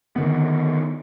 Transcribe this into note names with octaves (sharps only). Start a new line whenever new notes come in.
D3 D#3 B3